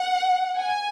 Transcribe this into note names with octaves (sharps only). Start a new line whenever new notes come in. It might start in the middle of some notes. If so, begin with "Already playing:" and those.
Already playing: F#5
G#5